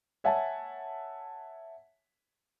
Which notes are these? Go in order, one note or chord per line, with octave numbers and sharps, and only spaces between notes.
C#5 E5 F#5 G#5 A5